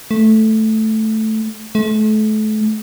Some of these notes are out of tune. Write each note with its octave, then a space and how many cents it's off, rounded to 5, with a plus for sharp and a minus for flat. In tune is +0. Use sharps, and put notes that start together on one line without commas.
A3 -5
A3 -35